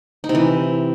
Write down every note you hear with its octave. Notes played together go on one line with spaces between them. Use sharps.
D#4
C3
E3